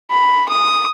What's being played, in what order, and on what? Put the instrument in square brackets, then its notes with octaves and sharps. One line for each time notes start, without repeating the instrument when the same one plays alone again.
[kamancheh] B5
D#6